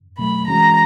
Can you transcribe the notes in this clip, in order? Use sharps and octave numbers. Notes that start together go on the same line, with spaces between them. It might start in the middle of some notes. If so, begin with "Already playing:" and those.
B2 F#3 A3 B5
C3 E3 G#3 C#4 F#4 A#5